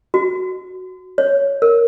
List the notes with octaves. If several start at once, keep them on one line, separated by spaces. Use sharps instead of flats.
F#4
C#5
A#4